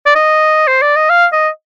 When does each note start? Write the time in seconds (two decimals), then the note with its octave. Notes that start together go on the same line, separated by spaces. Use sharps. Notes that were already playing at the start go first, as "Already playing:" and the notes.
0.06 D5
0.16 D#5
0.68 C5
0.82 D5
0.96 D#5
1.10 F5
1.33 D#5